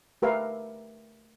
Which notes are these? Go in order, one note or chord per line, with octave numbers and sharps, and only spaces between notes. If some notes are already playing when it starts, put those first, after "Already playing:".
A3 G4 A#4 B4 E5 F5